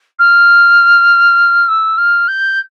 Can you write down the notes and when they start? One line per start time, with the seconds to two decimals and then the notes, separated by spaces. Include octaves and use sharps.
0.19 F6
1.68 E6
1.98 F6
2.28 G6